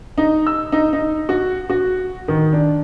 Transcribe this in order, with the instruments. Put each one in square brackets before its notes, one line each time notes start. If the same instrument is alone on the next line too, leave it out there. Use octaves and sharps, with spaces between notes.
[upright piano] D#4
E6
D#4
D#4
F#4
F#4
D#3
D4